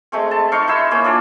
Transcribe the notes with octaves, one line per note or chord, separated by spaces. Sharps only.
G#3 A3 C4
A5
D#4 F5 C6 C#6
D#4 E4 C6 E6
A#3 C#4
D4 F4 D5